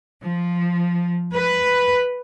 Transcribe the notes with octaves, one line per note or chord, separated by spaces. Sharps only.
F3
B4